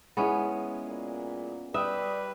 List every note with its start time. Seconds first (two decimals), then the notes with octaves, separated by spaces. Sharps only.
0.17 G#3 B3 C#4 E4 G#4
0.87 A#2
1.74 G3 B4 E5 G5 D#6